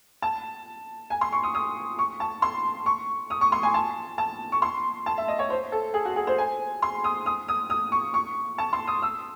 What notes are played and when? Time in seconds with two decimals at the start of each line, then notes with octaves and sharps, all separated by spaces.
0.22 A5
1.10 G#5
1.21 C6
1.32 C#6
1.43 D#6
1.55 D#6
1.99 C#6
2.20 A5
2.42 C6
2.86 C#6
3.30 D#6
3.41 C#6
3.52 C6
3.63 G#5
3.74 A5
4.18 A5
4.52 C#6
4.62 C6
5.06 A5
5.18 E5
5.28 D#5
5.39 C#5
5.50 C5
5.72 A4
5.94 G#4
6.05 F#4
6.16 G#4
6.27 C5
6.38 G#5
6.82 C6
7.04 D#6
7.26 D#6
7.48 D#6
7.70 D#6
7.92 C#6
8.14 C#6
8.58 A5
8.73 C6
8.87 D#6
9.02 E6